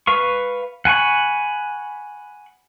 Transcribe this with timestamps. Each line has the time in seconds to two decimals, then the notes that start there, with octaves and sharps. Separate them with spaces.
0.07 B4 F5 C#6
0.85 F#5 G#5 B5 C#6